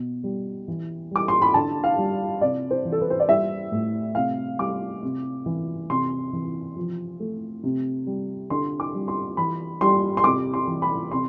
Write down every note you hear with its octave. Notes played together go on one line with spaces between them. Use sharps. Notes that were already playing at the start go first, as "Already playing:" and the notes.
Already playing: B2
G3
E3
G3 D6
C6
B5
D3 A5
F5
G3
C3 D5
C5
E3
A4
B4
C5
D5
G3 E5
A2
C3 F5
G3 D6
C3
E3
C3 C6
E3
F3
A3
C3
G3
D3 C6
D6
G3
C6
E3 B5
G3 C6
C6
C3 D6
C6
E3
B5
C3 C6